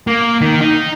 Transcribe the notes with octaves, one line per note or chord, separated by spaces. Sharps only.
A#3
D#3
D#4